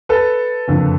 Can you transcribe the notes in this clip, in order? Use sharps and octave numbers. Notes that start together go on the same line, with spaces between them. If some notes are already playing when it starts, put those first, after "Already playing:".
A4 B4
F#1 F2 D3